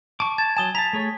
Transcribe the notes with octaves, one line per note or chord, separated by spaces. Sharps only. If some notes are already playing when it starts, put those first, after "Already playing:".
A5 C#6 D6
A5 G#6
F#3 G#5 A5 D#6 G7
A5 A#5 B6
A3 G#4 C#5